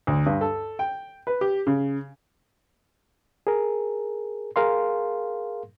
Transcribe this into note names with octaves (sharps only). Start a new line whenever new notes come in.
D2
G2
A4
G5
B4
G4
C#3
G#4 A#4
G#4 A#4 F5 C6